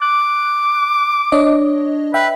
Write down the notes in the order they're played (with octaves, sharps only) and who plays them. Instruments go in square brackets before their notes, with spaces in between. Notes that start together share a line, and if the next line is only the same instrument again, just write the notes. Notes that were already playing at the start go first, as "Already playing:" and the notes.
[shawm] D6 [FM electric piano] F#6
[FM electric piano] D4 C#5 D#5
[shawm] B4 [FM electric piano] E5 G5